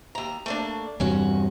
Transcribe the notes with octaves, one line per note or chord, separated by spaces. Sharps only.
D#2 A#5
A3 A#3 D4
E2 G2 C3 C#4 F#4